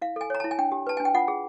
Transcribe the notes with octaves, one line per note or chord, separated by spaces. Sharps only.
E4 F5
A4 G#5
C#5 A#5
E4 A5
G#5
D4 G5
G4
B4 A5
D4 G#5
G5
F4 F#5
G#4